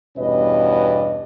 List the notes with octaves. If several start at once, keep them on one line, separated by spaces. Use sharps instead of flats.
E2 G2 B2 C#4 B4 D#5